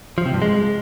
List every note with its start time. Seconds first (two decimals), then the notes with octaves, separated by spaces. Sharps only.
0.18 F3
0.26 C3
0.34 G2
0.42 G#3